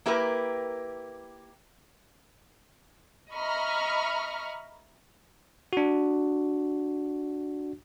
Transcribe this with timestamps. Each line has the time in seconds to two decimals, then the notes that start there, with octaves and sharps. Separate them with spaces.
0.06 A#3 E4 G4 A#4 B4
3.31 D#5 E5 A#5 B5 C#6 F6
5.73 D4 F#4